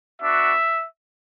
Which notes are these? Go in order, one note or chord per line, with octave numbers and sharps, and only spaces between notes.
B3 D4 F#4 E5